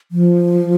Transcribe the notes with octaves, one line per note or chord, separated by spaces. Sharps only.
F3